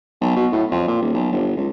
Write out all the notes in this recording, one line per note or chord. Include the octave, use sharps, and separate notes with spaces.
B1
B2
A2
F2
A#2
D#1
B1
G1
C#2